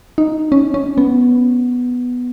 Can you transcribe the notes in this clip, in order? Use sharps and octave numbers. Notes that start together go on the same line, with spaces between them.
D#4
C#4
C#4
B3